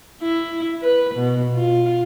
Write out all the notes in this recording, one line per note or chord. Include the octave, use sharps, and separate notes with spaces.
E4
B4
B2
F4